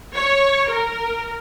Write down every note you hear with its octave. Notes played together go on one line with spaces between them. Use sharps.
C#5
A#4